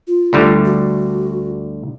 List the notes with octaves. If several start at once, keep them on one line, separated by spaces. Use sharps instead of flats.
F4
D2 D3 G3
F#4